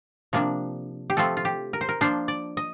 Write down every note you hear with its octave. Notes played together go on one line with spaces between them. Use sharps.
C3 F3 A#3 D4
G4
F3 A3 C4 F4 A4
F4
G4
A#4
C5
A#4
F3 A#3 D4 F4 C5
D5
D#5